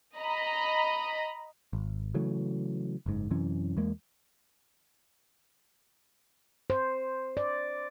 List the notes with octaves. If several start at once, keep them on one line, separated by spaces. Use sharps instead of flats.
D#5 A#5 B5
G#1
C#3 E3 F#3 A3
F#1 G#2
F#2 C3 E3 C#4
E2 G#3 A#3
C5
D5